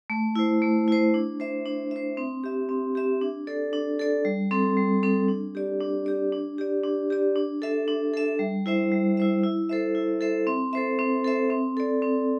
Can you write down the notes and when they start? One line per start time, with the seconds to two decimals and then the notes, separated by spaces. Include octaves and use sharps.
0.10 A3
0.36 E4 C5
0.62 A3
0.88 E4 C5
1.14 D4
1.40 C5 E5
1.66 D4
1.91 C5 E5
2.17 C4
2.44 G4 E5
2.69 C4
2.95 G4 E5
3.21 D4
3.47 A4 D5
3.73 D4
3.99 A4 D5
4.25 G3
4.51 C4 A4
4.77 G3
5.03 C4 A4
5.29 D4
5.55 G4 D5
5.81 D4
6.06 G4 D5
6.32 D4
6.58 G4 D5
6.83 D4
7.10 G4 D5
7.36 D4
7.62 A4 E5
7.88 D4
8.14 A4 E5
8.39 G3
8.66 E4 C5 E5
8.91 G3
9.17 E4 C5 E5
9.44 E4
9.69 A4 C5 E5
9.95 E4
10.21 A4 C5 E5
10.47 C4
10.73 A4 C5 E5
10.99 C4
11.24 A4 C5 E5
11.50 C4
11.77 A4 D5
12.02 C4